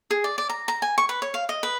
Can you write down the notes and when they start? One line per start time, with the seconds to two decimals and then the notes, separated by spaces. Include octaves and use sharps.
0.11 G#4
0.24 D5
0.38 D5
0.49 A#5
0.68 A#5
0.82 G#5
0.98 C#6
1.09 B4
1.22 C#5
1.34 F5
1.49 D#5
1.63 B4